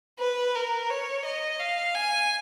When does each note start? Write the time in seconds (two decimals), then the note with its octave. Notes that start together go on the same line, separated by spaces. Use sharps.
0.19 B4
0.55 A#4
0.90 C#5
1.25 D#5
1.59 F5
1.95 G#5